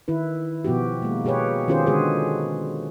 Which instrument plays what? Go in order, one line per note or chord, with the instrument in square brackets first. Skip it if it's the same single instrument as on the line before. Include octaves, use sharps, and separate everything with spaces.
[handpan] D#3 E4 B4
B2 F3 B3 F#4 G4
G#3 A#3
B2 G4 G#4 B4 C#5
D#3 C#4 F4 G4 G#4 C5
D3 G#3 F#4 G#4 B4